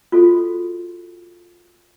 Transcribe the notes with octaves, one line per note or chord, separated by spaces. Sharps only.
F4 F#4 A4